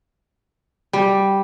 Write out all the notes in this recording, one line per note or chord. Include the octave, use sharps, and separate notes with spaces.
G3